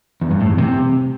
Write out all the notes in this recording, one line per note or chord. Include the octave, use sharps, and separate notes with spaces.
E2
G2
A2
E2
C3